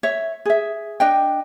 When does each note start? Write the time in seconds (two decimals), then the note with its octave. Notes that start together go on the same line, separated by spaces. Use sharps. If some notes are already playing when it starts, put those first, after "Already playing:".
0.03 C#5 E5
0.45 G#4 E5
1.00 D4 D#5 G5